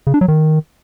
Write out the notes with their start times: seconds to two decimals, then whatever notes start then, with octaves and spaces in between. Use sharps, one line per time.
0.07 C#3
0.14 D4
0.21 F#3
0.28 D#3